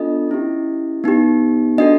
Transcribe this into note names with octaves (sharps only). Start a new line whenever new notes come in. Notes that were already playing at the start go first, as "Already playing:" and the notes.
Already playing: B3 D4 F4 A4 D#5
C#4 E4 G4
B3 D#4 G4
D4 F#4 A4 D#5